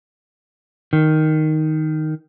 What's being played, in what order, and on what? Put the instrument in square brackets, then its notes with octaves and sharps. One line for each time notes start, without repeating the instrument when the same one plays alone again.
[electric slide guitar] D#3